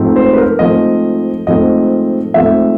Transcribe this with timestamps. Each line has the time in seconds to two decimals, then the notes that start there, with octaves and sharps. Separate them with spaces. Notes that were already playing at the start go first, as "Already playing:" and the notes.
Already playing: G#2 F3 A3 C4
0.16 C5
0.33 B4
0.38 A#4
0.59 G#2 F3 A3 C4 D#5
1.47 G#2 F3 A3 C4 D#5
2.34 G#2 F3 A3 C4 E5